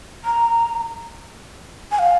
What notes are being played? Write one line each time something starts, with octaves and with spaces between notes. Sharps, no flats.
A#5
G#5
F5